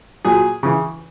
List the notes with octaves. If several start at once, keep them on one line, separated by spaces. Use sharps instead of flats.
A#2 F#3 G#4
C#3 E3